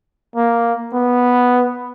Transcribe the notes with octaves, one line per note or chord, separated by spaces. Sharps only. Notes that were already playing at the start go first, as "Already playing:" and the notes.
A#3
B3